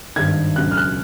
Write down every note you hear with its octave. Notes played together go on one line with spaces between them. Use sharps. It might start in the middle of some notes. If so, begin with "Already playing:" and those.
G#1 G2 D#3 G#6
E1 D2 C#3 F#3 F#6
F6
F#6